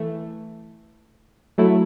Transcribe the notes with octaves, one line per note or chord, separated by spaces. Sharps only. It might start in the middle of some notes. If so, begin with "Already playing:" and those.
Already playing: E3 A3
F#3 A3 E4